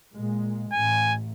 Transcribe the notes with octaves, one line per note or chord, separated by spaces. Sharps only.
A#2 G#3
A1 G#5